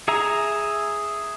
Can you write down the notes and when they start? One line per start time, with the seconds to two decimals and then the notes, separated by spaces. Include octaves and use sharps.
0.08 G#4 E5 G#5 A#5